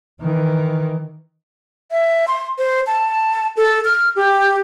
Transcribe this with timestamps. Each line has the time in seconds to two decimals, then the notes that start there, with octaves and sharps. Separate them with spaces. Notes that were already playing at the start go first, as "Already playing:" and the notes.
0.21 D#3 E3
1.91 E5
2.28 C6
2.58 C5
2.87 A5
3.57 A4
3.85 F6
4.16 G4